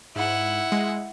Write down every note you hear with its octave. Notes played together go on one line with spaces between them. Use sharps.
G#2 E4 F#5
G#3